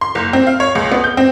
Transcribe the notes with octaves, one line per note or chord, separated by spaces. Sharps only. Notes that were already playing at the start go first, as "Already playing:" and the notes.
C6
F#1
C4
F5
C#5
C#2
B3
G6
C4